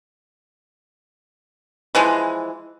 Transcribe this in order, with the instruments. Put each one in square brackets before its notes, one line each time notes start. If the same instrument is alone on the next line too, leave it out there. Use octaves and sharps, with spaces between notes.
[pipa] E3 F3 G#3